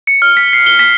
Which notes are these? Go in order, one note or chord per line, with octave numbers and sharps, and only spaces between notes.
C#7
F6
B6
C7
G7
B6